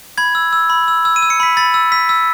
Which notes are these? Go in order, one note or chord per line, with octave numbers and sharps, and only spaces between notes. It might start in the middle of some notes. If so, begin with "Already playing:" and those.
B5 G#6
E6
E6
B5
E6
E6
D#7
E6
C#7
B5 B6
B5 A6
E6
E6 B6
E6